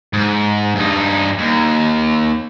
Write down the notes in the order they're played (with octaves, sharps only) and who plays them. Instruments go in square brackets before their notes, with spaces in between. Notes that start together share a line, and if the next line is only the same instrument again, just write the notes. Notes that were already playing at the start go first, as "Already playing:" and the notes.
[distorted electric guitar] G#2
G2 D#4
D#2